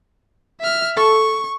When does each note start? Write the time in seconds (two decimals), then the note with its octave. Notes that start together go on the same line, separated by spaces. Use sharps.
0.60 E5 F6
0.97 A4 C#6